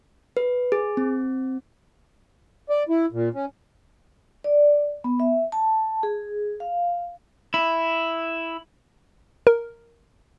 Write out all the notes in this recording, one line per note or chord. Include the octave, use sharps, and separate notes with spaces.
B4
G#4
C4
D5
E4
A#2
C#4
D5
B3
E5
A5
G#4
F5
E4
A#4